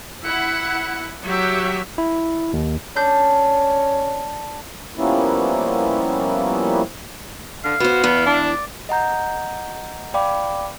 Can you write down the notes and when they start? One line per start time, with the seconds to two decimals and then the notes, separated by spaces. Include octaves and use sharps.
0.25 E4 F#5
1.25 F#3 G4 E5
1.98 E4
2.53 D#2
2.96 C#4 D4 G6
4.97 F3 G3 A#3 B3 C#4 E4
7.64 D3 F5
7.80 B3 F#4 C5
8.04 E2 B3 E4
8.26 D4
8.48 D5
8.89 D#5 F#5 A#5 G6
10.14 D5 F5 G5 B5 D6